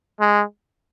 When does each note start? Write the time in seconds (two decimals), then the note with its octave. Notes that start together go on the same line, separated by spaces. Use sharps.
0.20 G#3